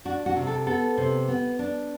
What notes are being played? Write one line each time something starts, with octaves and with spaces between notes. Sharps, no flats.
D4 F#4
F#4
C3
A4
B3 A4
C3
B3
D4